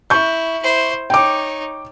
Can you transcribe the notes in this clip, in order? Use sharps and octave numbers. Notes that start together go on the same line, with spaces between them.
E4 C#6 G6
E4 C5
D#4 C#5 G5 D6